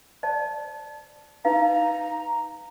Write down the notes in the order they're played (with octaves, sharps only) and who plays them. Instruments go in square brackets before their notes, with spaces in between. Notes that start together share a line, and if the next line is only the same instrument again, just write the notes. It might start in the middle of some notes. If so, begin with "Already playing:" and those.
[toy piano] C5 D5 A5
[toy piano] D#4 B4 F5 [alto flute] A#5